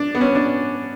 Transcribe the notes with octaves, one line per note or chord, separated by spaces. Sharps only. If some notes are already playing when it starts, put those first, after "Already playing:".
Already playing: D4
B3
C#4
D4